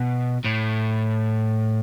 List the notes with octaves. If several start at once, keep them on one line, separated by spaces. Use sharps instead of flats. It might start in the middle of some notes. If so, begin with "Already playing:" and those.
Already playing: B2
A2